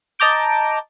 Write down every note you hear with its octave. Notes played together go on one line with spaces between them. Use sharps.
D#5 A5 A#5 D6 G6 D7